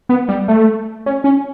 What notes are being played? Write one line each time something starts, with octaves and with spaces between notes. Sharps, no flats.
B3
G3
A3
C#4
C#4